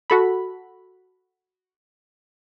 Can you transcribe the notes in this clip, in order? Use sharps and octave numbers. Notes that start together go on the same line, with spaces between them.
F#4 A4 B5